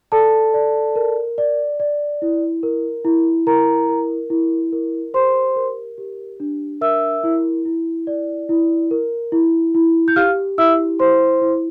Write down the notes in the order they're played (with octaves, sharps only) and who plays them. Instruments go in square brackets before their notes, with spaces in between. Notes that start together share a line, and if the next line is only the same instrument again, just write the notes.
[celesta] A4 D5 A5
D5
A#4
D5
D5
E4
A#4
E4
E4 A#4 A#5
A#4
E4
A#4
G4 C5 C6
A#4
G4
D4
A#4 E5 E6
E4
E4
D5
E4
A#4
E4
E4
G6
G4 F5 F6
E4 E5 E6
E4 C5 C6
E4